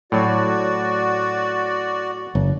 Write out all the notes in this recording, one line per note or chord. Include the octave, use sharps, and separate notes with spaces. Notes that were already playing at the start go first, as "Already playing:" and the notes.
A2 F#3 F#4 D5
F#1